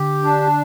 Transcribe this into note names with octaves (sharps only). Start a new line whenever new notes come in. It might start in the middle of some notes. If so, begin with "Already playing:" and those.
Already playing: D3 G4
D4